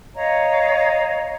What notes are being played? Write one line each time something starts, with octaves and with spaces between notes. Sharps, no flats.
C#5 D#5 F5 A#5